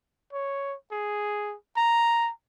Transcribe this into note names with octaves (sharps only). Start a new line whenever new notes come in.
C#5
G#4
A#5